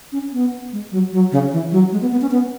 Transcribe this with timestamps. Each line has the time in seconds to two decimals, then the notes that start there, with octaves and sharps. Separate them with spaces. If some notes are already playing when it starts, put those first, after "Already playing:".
0.12 C#4
0.33 B3
0.72 G#3
0.92 F#3
1.12 F#3
1.32 C#3
1.52 E3
1.71 F#3
1.92 G#3
2.01 B3
2.12 B3
2.21 C#4
2.31 B3